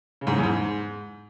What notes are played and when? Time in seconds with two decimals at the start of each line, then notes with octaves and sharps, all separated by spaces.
0.21 C#3
0.27 G#2
0.32 C#3
0.38 E2
0.43 G#2